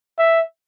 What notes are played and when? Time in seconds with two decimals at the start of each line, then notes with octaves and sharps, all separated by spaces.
0.18 E5